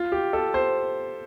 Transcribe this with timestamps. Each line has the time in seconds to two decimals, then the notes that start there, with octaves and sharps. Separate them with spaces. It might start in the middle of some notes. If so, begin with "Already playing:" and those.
Already playing: F4
0.12 G4
0.33 A4
0.54 C5